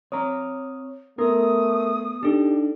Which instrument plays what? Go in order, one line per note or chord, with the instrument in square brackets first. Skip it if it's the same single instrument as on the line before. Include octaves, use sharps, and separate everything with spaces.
[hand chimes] C4 D#6 [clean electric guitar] C#5 A#5
[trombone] A3 [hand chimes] B3 [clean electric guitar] A#4 [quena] D#6
[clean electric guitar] D4 [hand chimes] D#4 A4 [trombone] G4